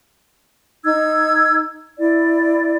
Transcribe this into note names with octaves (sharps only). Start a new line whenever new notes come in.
D#4 E6 G#6
E4 D5